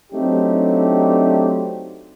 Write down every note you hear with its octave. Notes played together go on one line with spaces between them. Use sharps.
F#3 A3 C4 D4 D#4 G4